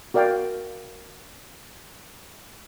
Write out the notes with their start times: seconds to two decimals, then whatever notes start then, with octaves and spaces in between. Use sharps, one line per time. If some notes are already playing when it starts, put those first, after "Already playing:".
0.14 F#4 A#4 D5 F5 G5